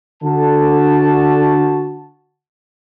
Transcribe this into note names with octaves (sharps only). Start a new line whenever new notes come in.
D3 F#4 A5